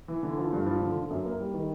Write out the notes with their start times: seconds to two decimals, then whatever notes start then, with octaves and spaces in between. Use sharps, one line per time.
0.08 E3
0.23 D3
0.37 F3
0.53 G2
0.66 F3
0.81 D3
0.96 D3
1.10 F#2
1.25 A#3
1.40 G3
1.54 D#3